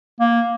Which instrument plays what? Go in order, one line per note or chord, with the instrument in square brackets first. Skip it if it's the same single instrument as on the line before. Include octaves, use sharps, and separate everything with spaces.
[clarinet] A#3